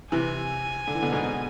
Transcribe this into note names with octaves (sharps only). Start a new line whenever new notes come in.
C3 E3 G#5
D3
E3
B2 D3
G#2 B2